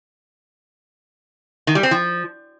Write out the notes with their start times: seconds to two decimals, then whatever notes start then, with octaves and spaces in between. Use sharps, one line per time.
1.67 D#3
1.75 G3
1.83 C4
1.91 F3